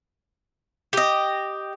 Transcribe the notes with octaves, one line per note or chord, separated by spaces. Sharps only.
G4 D#5